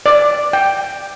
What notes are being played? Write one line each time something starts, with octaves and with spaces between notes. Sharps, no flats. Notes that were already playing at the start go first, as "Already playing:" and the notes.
D5
G5